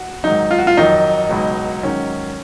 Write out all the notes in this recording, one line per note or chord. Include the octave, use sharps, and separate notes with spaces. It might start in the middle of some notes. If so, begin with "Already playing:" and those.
Already playing: F#4
G#2 D#3 F#3 D#4
F4
F#4
F4
F2 D#3 F#3 D#4
C#2 B2 F#3
G#2 D#3 F#3 C#4